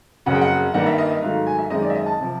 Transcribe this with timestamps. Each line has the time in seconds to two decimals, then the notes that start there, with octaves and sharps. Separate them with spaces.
0.26 F#1 F2 C#3 F#3 F#5
0.34 G5
0.41 F#5
0.74 G2 D#3 G3 A#3 F#5
0.86 E5
0.98 D#5
1.10 E5
1.22 G#2 D#3 F#3 A3 F5
1.47 G#5
1.58 E5
1.70 F#2 D#3 G#3 C4 D#5
1.82 D5
1.90 E5
1.95 D#5
2.06 A5
2.20 C3 F3